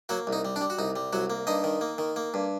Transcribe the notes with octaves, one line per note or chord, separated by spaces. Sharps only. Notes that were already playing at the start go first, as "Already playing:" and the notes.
F#3 A#3 F#4
C2
D#4
G3
D4
G3
F#4
C2 D#4
G3
C2 F#3 F#4
A#3
G2 D#4 D#5
D#3
A#3
D#3
A#3
G2